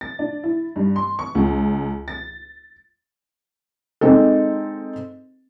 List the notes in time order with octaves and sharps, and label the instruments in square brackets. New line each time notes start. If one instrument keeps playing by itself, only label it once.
[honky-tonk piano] A6
D4
E4
G2
C6
C#6
C#2
A6
[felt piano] G#3 C4 D#4 A4